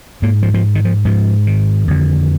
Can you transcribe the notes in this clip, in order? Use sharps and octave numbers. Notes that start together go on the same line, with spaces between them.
G#2 A#3
F3
F3
D#3
F3
G#2 F3
D#3
F2 D3